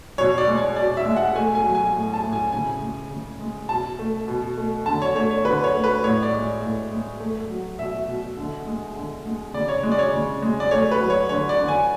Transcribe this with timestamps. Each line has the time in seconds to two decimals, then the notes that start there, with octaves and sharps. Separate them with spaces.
0.18 B2 C#5
0.38 D5
0.48 G#3
0.57 C#5
0.76 B2 D5
0.97 E5
1.06 G#3
1.17 F#5
1.35 A3 G#5
1.55 G#5
1.64 F#3
1.75 G#5
1.94 A2
2.13 A5
2.23 A2
2.33 G#5
2.52 C#3 G#5
2.81 G#3
3.11 C#3
3.40 G#3
3.69 B2 A5
3.99 A3
4.28 B2
4.58 A3
4.86 D3 A5
5.02 C#5
5.15 A3 C#5
5.31 C#5
5.45 D3 B4
5.64 C#5
5.74 A3
5.84 B4
6.03 A2 C#5
6.23 D5
6.33 G#3
6.62 A2
6.91 G#3
7.20 A3
7.49 F#3
7.79 B2 E5
8.08 B2
8.37 D3
8.66 G#3
8.96 D3
9.26 G#3
9.54 C#3 D5
9.68 C#5
9.83 G#3
9.92 D5
9.99 C#5
10.13 C#3
10.42 G#3
10.60 D5
10.71 A3 C#5
10.91 B4
11.01 F#3
11.10 C#5
11.29 D3 C#5
11.49 D5
11.59 D3
11.68 G#5